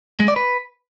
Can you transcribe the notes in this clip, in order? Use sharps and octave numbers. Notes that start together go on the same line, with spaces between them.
G#3
D5
B4